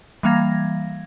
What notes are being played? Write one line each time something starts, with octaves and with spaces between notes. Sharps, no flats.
E3 G3 A#3 F5 G#6 A#6